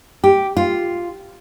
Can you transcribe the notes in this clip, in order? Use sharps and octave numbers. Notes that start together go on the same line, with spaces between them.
G4
F4